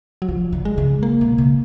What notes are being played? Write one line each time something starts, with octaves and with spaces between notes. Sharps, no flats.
F#3
D3 F3
D3
G#3
C#3
A#3
B2
C#3